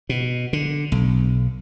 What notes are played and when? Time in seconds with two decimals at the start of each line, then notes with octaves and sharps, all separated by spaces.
0.09 B2
0.53 D3
0.92 B1